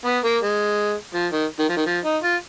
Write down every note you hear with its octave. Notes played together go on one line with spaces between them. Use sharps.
B3
A#3
G#3
F3
D#3
D#3
F3
D#3
F3
D#4
F4